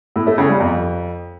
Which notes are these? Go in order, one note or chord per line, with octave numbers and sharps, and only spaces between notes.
A2
A3
C#3
G3
F2